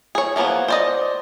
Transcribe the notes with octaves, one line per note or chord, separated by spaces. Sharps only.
G#4 C#5
E3 F3 A#3 B3 C#5
C5 D5 D#5